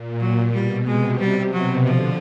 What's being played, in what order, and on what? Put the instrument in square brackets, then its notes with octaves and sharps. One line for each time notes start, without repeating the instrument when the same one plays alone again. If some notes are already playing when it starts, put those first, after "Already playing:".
Already playing: [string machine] A#2
[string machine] A#2 [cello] F#3
[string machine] B2 [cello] G3
[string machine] C3 [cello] G#3
[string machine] C3 [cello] G3
[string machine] B2 [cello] F#3
[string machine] D3 [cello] F3